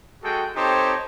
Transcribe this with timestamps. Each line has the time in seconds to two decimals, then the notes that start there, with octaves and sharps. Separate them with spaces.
0.23 G#3 F#4 G#4 A4 G5
0.56 C4 D#4 G4 A4 C5 C#5